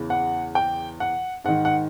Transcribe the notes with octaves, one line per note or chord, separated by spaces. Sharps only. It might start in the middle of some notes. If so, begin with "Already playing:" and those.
Already playing: E2 C#3 E3
F#5
G5
F#5
G#2 D#3 F#5
F#5